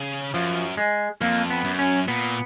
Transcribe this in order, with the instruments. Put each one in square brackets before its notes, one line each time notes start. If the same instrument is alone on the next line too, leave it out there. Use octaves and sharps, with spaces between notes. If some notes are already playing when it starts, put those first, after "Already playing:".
Already playing: [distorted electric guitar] C#3
[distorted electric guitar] F#2 [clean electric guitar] F3
[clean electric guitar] G#3
[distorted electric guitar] F2 [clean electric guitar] A#3
[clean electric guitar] B3
[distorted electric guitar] F#2
[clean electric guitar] C#4
[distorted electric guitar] A#2 [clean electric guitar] B3